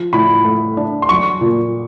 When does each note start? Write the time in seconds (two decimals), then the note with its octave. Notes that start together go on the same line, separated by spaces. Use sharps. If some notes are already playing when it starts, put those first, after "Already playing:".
Already playing: F3
0.13 A2 B5
0.45 A3
0.77 D4
1.02 C6
1.09 F#3 C#6
1.41 A#2